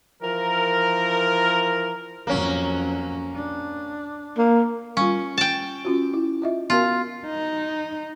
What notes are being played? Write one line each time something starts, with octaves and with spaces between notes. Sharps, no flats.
E3 F3 A#4
F2 F#3 A#3 C#4
D4
A#3
G3 C#4 F4
G5 A5
C#4 F4 F#4
E4
F4 D#5 E5
B3 F4 F#4 A#4
D#4